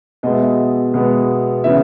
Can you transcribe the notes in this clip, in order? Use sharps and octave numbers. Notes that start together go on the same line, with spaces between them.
B2 G#3 B3 D#5
E5
D#5
B2 G#3 B3
C#3 E3 B3 E5